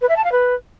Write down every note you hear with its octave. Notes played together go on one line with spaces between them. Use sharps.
B4
E5
A5
F5
B4